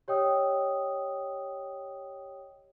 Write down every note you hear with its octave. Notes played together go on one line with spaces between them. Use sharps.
G4 C#5 D#5 G5 D#6 E6